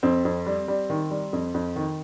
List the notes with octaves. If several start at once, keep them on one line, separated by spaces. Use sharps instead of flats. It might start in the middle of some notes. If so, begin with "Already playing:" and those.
F2 C4
F2
G3
G3
D#3
G3
F2
F2
D#3